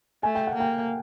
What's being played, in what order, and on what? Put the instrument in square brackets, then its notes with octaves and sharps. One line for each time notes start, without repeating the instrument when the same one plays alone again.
[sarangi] A3 [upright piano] G#5
[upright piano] G5
F#5
[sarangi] A#3
[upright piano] G5